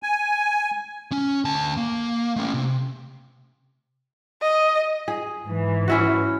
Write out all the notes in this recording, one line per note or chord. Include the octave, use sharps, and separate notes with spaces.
G#5
C#4
D2 A5
A#3
A3 C#4
C3
D#5
G#4
G#2 E3
C#4 E4 F#4